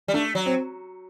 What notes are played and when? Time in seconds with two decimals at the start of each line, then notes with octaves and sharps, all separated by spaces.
0.08 G3
0.13 A3 D4
0.35 F#3
0.46 C4